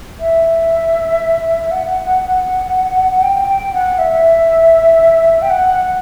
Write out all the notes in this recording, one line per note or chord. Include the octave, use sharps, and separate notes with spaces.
E5
F#5
G5
G5
F#5
E5
G5
F#5